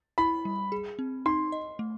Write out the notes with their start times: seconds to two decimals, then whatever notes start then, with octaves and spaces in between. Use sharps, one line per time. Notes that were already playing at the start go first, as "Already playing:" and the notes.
0.18 E4 B5
0.45 G3
0.72 G#4
0.99 C4
1.26 D#4 C6
1.52 D#5
1.79 A3